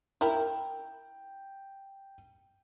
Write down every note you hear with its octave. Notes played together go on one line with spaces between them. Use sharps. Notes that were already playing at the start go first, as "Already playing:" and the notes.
E4 A#4 G5